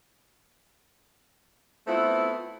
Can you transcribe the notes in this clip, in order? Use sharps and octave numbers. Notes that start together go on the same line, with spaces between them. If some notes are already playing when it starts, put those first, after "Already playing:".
A3 B3 C4 E4 F4